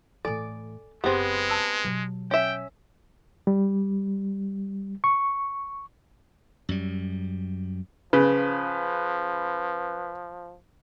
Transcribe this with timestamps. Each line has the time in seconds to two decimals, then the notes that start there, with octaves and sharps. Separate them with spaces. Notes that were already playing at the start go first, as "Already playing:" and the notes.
0.25 A2 E3 A4 D5 G#5
1.04 F#1 G#3 B3 C4 G4 G#4 C6
1.50 A5 E6
1.84 B2 F#3
2.31 C#4 E5 G5
3.47 G3
5.04 C#6
6.69 F#2 G3
8.13 C#3 F3 B4